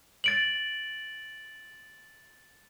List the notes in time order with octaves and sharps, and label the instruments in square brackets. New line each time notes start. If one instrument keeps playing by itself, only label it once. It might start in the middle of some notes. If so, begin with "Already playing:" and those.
[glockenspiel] A6 D7 F#7